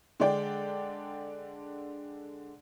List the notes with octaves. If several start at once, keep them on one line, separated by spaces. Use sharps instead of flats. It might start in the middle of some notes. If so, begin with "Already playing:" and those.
D3 G#3 D4 D5 G5